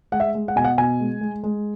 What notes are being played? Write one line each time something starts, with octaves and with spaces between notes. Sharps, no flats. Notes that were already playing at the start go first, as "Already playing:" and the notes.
G#3 F#5
E5
G#3
F#5
B2 G#5
F#5
B2 G#5
G#3
G#3
G#3